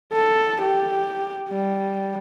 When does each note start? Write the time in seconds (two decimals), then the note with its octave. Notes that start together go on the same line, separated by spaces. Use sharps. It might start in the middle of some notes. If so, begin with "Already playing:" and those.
0.14 A4
0.62 G4
1.50 G3